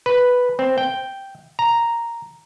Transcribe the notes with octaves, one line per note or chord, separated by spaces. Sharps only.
B4
C4
G5
A#5